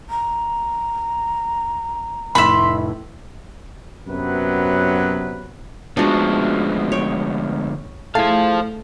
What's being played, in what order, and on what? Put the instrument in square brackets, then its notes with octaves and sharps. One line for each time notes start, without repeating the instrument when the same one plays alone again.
[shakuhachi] A#5
[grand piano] F1 A2 [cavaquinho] E5 B5 [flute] C6
[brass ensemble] F#2 C3 F#3 B3 B4
[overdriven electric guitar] D2 F3 [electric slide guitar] G#3 B3 [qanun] D4 F#4
[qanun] C#5 G5
[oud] A3 [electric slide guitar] E4 G#4 A5 [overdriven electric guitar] C5 F5